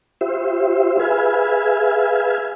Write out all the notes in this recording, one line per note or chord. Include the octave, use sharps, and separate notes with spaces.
F4 G4 C5 E5
G#4 B4 E5 F5 G#5